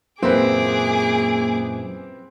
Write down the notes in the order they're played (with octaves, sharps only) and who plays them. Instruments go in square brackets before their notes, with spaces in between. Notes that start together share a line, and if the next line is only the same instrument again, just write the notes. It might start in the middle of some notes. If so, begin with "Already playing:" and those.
[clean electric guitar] F#2 A#2 E4 [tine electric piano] A#3 [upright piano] C4 B4 [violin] G#4 D6